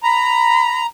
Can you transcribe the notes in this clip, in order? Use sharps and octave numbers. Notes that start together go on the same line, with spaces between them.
A#5 B5